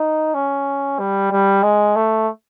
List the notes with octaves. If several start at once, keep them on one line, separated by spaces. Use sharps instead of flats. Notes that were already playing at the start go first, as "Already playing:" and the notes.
Already playing: D#4
C#4
G3
G3
G#3
A3